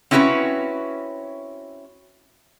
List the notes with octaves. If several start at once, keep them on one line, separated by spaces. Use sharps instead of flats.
C4 C#4 E4 F#4 B4 C#5